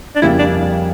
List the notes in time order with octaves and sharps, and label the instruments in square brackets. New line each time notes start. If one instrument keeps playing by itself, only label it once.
[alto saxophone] D4
[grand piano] F2 C#3 G3 A#3 [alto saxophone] E4
[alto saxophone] D4